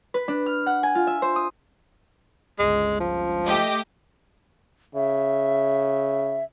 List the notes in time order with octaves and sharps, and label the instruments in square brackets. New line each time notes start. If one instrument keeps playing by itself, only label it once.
[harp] B4
D4
F6
F#5
G#5
F4
E5
C5
D#6
[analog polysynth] G1 C#2 [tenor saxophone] G#3
[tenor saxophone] F3
[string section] A3 G4 D#5
[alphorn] C#3 [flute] E5